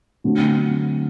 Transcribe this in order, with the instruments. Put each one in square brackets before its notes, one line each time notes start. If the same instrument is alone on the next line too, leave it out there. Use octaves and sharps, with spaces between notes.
[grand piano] D3 F#3 A3 C4